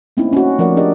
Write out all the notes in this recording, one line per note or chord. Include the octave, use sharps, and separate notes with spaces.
A3 A#3 C4 C#4 D#4 E4
C#4 F#4
F3 A3 A#4 D5 F#5
D4 D#4 G4 A#4 D5 D#5